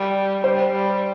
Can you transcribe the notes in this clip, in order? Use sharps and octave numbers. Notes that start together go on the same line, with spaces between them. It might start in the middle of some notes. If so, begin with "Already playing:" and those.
Already playing: G3
G3 C5
G3